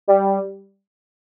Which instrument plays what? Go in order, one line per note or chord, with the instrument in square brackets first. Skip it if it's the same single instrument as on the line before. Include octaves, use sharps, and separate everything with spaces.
[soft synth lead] G3